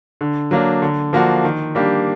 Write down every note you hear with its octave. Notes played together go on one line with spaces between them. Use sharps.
D3
F#3 A#3 D4
D3
F3 A#3 D4 F#4
D#3
G3 A#3 D4 G4